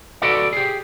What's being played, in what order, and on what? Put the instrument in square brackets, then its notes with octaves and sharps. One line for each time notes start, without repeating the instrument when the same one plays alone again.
[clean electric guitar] F#4 A4 B4 D5 D#5
G4 G#4